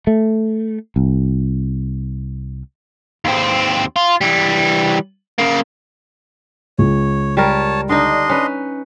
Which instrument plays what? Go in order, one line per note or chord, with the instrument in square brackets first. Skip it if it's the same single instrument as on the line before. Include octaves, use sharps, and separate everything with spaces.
[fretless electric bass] A3
C2
[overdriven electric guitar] D#2 C4
F4
E3 G3
C#3 A#3
[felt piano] C#2 [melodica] C#5
[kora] G3 A#4 [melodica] C#5 A5
[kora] D3 D#4 [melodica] D4 D#5 C6
[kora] C#4 B4